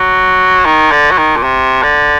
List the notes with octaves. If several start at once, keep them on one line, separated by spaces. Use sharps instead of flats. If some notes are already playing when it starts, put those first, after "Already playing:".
Already playing: F#3
D#3
D3
F#3
D#3
A#2
C3
D3